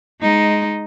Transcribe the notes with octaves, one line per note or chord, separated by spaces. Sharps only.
G#3 D#4